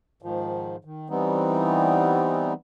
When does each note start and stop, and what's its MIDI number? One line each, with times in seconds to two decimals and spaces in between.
0.22 0.76 44
0.22 0.76 51
0.22 0.76 53
0.85 1.08 51
1.10 2.53 52
1.10 2.53 55
1.10 2.53 59
1.10 2.53 60
1.10 2.53 63